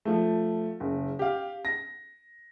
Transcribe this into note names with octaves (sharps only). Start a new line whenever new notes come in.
F3 A3
F#1
G4 F5
A#6